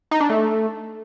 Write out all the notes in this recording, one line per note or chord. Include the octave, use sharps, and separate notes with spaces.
D#4
D4
A3